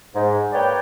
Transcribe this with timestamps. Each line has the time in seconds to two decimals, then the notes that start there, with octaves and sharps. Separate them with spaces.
0.15 G#2
0.53 A#3 B4 C#5 D5 G5